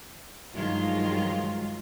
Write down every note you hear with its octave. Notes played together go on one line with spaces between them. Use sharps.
G2 D#3 F3 F#3 G#3 F4